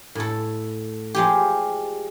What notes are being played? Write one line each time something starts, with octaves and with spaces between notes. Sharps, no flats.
A2 A4
F3 G#3 G4